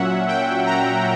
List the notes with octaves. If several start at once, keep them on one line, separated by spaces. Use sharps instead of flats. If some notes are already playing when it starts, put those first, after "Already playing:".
Already playing: A#2 F#3 C#4 E5 F#5
G5
A#5